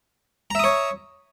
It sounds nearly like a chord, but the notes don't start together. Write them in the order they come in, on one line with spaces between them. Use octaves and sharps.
A#5 E5 D#6 C#5